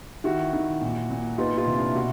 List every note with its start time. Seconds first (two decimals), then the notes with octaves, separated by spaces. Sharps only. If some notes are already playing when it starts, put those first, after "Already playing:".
0.24 D#3 E4 F#4
0.53 D#3
0.82 A#2
1.10 A#2
1.38 B3 D#4 F4
1.57 D#4 F4
1.67 C3
1.76 D4 E4
1.95 B2 E4 F#4